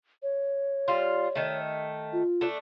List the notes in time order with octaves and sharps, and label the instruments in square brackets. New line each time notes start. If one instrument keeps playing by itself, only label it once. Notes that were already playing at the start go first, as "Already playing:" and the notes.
[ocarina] C#5
[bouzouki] G3 F4
D#3 A3
[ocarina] F4
[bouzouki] A3 D4